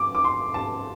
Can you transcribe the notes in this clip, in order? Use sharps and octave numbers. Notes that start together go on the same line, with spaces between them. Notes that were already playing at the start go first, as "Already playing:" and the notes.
Already playing: D6
D6
C6
A5